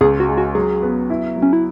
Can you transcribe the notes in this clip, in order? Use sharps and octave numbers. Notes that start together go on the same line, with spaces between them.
C#2 G#4
F#4
G#3
F#4
F#3 G#4
B3
E4
F#3
C#4
E4